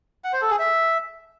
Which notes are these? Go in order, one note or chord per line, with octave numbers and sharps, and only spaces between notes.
F#5
C5
A4
G#4
E5